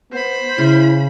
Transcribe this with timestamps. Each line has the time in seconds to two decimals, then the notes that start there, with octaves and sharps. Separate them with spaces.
0.12 B3 C5 B5
0.58 C#3 E4